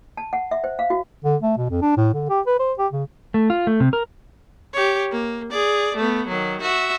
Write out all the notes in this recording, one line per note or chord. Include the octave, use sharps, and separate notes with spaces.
A5
F#5
E5
C5
F5
F#4
D3
A3
B2
F2
D4
A2
D3
G4
B4
C5
G4
C#3
A3
F4
A3
C3
A#4
G4 C#5
A#3
G#4 D5
A3 B3
D#3 F#3
F#4 E5